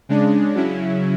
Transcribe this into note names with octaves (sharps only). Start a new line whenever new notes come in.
C#3 G#3 D4
C#3 F#3 C#4 E4